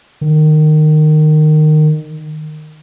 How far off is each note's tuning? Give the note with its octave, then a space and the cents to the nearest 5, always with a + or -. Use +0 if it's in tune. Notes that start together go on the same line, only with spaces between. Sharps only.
D#3 -20